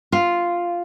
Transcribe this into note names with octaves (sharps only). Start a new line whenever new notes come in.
F4